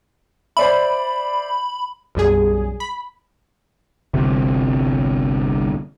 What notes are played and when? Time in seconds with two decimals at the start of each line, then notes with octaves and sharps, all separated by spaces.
0.57 C5 D5 E5 B5
2.15 B1 F#2 G3 G#4
2.80 B5
4.14 G1 C2 C3